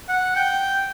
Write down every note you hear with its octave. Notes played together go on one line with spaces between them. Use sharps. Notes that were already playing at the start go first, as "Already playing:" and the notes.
F#5
G5